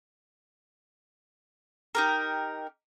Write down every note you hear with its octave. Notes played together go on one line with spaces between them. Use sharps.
D#4 G4 A#4